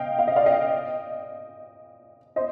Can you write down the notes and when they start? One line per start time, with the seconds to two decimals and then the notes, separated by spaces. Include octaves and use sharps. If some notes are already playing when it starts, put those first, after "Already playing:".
Already playing: D#5 F5 G5
0.19 F5
0.27 D#5
0.36 D5 F5
0.46 D#5 G5
2.36 C5 D#5